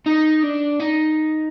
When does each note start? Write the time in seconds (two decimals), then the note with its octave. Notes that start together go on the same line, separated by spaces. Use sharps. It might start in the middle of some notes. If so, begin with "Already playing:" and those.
0.06 D#4
0.43 D4
0.80 D#4